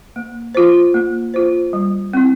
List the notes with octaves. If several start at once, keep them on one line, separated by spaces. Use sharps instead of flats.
A#3
F4 C5
A#3
F4 C5
G3
C4 E4